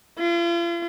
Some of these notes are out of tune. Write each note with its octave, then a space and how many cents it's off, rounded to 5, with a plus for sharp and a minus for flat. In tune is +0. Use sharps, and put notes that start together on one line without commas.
F4 -40